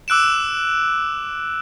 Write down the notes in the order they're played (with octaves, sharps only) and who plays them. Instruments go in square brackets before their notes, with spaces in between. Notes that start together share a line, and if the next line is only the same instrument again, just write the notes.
[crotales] D6 E6 F#6 D7 E7